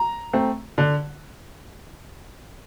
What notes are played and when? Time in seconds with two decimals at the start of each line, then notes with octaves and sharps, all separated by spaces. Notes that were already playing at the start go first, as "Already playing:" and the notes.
Already playing: A#5
0.33 A3 C4
0.78 D3